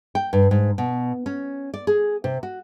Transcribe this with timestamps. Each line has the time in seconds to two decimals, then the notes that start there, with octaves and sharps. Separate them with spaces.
0.15 G5
0.33 G2
0.51 G#2
0.78 B2
1.26 C#4
1.74 D5
1.87 G#4
2.24 C3
2.43 F#4